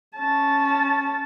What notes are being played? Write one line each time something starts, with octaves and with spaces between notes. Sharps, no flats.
C#4 A5